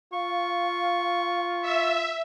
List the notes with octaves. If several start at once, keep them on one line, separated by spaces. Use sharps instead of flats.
F4 F5 C#6
E5